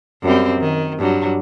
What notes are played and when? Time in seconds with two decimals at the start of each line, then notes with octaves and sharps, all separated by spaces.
0.23 F#2 G3 C4
0.61 D#3
0.98 G2 F#3